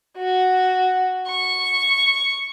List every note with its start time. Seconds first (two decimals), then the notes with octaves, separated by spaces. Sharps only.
0.17 F#4
1.27 C#6